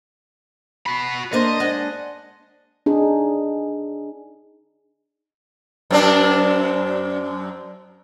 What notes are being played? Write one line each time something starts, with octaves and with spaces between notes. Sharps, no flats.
F#4 B5
A#3 D4 C5 D#5
G#3 D4 F#5
D4 D#4 G#4
F#2 C4 D4